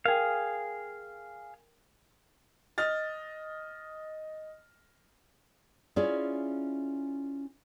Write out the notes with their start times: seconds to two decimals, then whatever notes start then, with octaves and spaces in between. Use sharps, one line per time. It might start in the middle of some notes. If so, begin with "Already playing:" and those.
0.06 G#4 A#4 F5 G5
2.78 D#5 F6 A6
5.96 C#4 E4 F4 G#4 D5